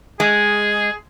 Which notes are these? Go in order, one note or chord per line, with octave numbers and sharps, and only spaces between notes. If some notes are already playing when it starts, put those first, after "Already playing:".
G#3 G#4